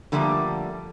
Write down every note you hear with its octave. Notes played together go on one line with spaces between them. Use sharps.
D3 F3 G3 A3 A#3